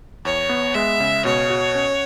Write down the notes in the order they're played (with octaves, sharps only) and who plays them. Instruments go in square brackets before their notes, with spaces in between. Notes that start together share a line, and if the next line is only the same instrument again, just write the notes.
[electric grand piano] E2 [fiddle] C#5
[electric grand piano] B3
[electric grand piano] G#3 [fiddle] E5
[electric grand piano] C#3
[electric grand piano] B2 [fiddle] C#5
[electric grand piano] F#4
C#4